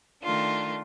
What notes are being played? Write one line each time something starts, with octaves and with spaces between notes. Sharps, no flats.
D#3 A3 D4 F4